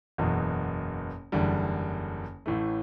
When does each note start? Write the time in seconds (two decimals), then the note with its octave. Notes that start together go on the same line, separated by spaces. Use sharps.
0.18 F#1 E2 B2
1.32 F#1 E2 D3 G3
2.46 A1 A2 E3 A3